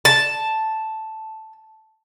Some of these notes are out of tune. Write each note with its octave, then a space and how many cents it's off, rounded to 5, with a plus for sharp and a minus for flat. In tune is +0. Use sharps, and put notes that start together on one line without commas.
A5 +0